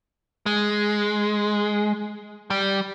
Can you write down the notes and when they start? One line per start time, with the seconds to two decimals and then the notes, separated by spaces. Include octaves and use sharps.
0.46 G#3
2.50 G3